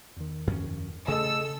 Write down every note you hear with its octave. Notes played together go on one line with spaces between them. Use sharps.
E2 D#3
F#2 F3 C#4
C#3 A3 G#4 A4 D#5 E6